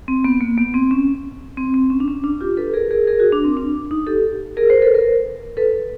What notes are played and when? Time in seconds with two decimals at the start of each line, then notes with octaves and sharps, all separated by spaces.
0.08 C4
0.24 B3
0.41 A#3
0.58 B3
0.74 C4
0.91 C#4
1.57 C4
1.74 C4
1.90 C#4
2.00 D4
2.08 C#4
2.24 D4
2.40 F4 G4
2.57 A4 B4
2.74 G#4 A#4
2.91 G#4 A#4
3.07 G#4 A#4
3.19 F#4 G#4
3.32 D4
3.45 C4
3.57 D4
3.91 D#4
4.07 G4 A4
4.57 G#4 A#4
4.69 A#4 C5
4.82 A4 B4
4.94 A#4 C5
5.57 A4 B4